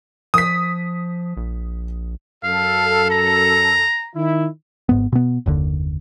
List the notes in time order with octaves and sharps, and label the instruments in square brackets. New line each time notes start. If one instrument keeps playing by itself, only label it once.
[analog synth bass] F3 [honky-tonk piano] D#6 B6
[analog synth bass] A#1
[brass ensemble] F#2 A4 [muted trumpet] F5
[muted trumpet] A#5
[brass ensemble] D#3 E4
[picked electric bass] G#1 G#2 B3
B2 B3
F#1 D#2 D3